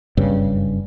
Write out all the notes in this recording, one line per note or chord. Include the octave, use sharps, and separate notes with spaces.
F#1 G2 C#3